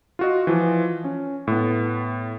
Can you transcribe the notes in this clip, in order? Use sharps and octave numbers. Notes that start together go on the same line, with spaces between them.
F4 F#4 D#5
E3 F3 F4
C#4
A2 B3